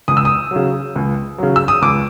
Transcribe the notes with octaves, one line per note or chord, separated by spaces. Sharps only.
C#2 D#6
E6
D#6
C#3 F#3
C#2
C#3 F#3
E6
D#6
C#2 D6